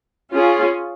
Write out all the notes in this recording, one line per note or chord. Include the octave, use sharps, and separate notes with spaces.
C#4 F4 G#4